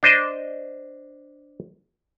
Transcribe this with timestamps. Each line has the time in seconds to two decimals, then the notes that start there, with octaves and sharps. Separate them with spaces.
0.03 D4 C5 D#5